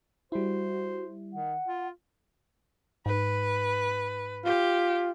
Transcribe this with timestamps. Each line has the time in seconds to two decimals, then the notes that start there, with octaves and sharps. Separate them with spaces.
0.32 G3 E4 F#4 C5
1.33 D#3 F#5
1.67 F4
3.06 G#2 B4
4.45 F4 G4